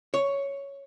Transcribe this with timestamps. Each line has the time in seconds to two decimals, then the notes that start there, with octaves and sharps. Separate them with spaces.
0.14 C#5